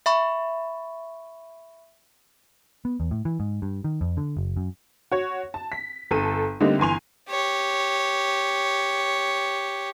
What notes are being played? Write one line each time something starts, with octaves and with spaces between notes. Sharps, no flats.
E5 B5 C#6
B3
E2
A2
E3
G#2
G2
D#3
F2
D3
F#1
F#2
F#4 C#5
A5
B6
G1 A4 D#7
D3 G3 A3 A#3 C4 D#4
G1 E3 G#5 C6 F7
G4 C#5